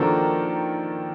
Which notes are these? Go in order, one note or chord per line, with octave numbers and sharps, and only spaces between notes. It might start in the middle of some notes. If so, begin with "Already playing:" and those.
Already playing: D#3 F3 A#3 D4 F#4 A4